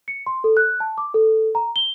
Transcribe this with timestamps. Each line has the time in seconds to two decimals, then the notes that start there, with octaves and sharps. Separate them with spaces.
0.08 C#7
0.27 C6
0.44 A4
0.57 F#6
0.80 A5
0.98 D6
1.14 A4
1.55 A#5
1.76 G7